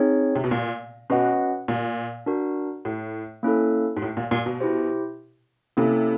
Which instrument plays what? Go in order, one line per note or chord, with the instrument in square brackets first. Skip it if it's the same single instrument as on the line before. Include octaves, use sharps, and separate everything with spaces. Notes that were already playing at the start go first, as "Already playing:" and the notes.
Already playing: [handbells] C4 D#4 G#4 C#5
[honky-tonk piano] C3
B2
A#2
[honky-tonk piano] B2 [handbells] C#4 F#4 B4 D#5 F#5
[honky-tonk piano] A#2
[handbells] D4 F#4 A#4
[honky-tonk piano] A2
[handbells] A#3 C#4 E4 A4
[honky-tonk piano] G#2
A2
A#2
A#2
B2
[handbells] E4 G4 C5
[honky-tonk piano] C3 [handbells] A#3 C#4 E4 A4